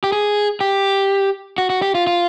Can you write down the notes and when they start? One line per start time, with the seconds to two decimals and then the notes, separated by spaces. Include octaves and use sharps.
0.04 G4
0.12 G#4
0.61 G4
1.58 F#4
1.70 F#4
1.82 G4
1.95 F4
2.07 F4